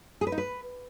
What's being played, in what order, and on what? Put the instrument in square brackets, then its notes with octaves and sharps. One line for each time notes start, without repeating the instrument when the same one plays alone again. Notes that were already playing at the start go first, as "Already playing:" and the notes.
[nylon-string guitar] G#4
B4
D#4
B4